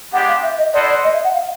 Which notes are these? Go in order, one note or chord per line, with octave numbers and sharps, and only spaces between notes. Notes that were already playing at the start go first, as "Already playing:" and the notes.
G#3 B3 D4 G4 F#5
F5
E5
D#5
E4 A4 C5 D5 D#5 F#5
D5
D#5
E5
F#5
F5